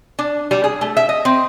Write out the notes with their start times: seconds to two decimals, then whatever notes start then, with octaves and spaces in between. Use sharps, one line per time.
0.19 D4
0.51 G3
0.64 G#4
0.81 A3
0.97 E5
1.09 D#5
1.25 C4